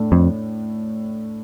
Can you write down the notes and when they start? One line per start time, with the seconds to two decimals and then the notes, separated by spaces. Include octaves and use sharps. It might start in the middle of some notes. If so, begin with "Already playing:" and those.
Already playing: A2 A3 D4
0.12 F2